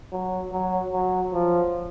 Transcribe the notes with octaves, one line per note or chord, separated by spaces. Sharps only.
F#3
F#3
F#3
F3